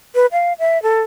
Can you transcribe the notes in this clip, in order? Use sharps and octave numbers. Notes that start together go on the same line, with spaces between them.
B4
F5
E5
A4